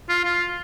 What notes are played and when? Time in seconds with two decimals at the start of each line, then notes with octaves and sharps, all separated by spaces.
0.09 F4
0.25 F4